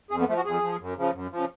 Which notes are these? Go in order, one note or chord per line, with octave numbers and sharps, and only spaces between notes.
F2 G#4
B3
F3 A3
F#4
F2 G#4
F3
F#2
C#3 F3
F#2
C#3 F3